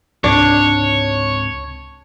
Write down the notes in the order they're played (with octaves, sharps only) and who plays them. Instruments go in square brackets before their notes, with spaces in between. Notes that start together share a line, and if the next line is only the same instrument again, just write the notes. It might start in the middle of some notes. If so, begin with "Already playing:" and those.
[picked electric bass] C#2 G#2 C3 [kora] D4 [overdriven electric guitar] C#5